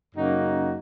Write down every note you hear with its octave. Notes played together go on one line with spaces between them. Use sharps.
F#2 C#3 A#3 D#4 F#4